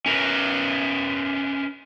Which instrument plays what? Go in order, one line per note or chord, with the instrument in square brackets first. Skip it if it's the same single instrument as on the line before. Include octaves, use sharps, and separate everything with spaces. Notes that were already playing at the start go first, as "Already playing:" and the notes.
[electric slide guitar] C#4 A#4 B4